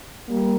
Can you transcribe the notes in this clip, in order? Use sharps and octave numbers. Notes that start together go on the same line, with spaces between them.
G3 A#3